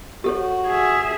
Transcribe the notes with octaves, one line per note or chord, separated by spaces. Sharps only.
F#4 G4 A4 C#5
G#4 E5